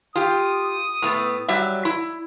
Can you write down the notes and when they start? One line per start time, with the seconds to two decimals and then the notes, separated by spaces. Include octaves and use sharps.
0.15 F4 G4 D#6
1.02 A2 A3 B3
1.48 F#3 G3 E5
1.85 E4